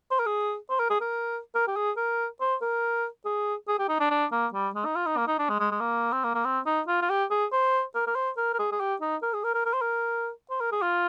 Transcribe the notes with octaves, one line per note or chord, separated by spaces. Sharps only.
C5
A#4
G#4
C5
A#4
G#4
A#4
A#4
G4
G#4
A#4
C5
A#4
G#4
G#4
G4
D#4
D4
D4
A#3
G3
G#3
D#4
F4
D#4
A#3
D#4
D4
G#3
G#3
G#3
A#3
C4
A#3
A#3
C4
D#4
F4
F4
G4
G#4
C5
A#4
A#4
C5
A#4
A#4
G#4
G#4
G4
D#4
A#4
G#4
A#4
A#4
A#4
C5
A#4
C5
A#4
G#4
F4